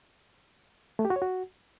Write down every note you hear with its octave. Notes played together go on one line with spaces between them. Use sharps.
A3
G4
F#4
C#5
F#4